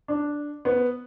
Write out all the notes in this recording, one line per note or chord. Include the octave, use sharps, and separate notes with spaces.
D4
B3